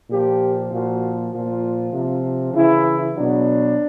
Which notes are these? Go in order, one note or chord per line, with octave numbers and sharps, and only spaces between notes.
A#2 F3 G4
A#2 F3 F#4
A#2 F3 F4
C3 F3
C#3 E3 E4
B2 F#3 D4